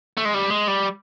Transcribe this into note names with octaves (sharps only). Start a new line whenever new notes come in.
A3
G#3
G3
G#3
G3